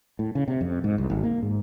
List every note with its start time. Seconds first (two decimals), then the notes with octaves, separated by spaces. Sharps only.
0.19 A2
0.35 C#3
0.48 C3
0.61 F2
0.84 G#2
0.98 C2
1.10 G#1
1.23 A#3
1.43 G#2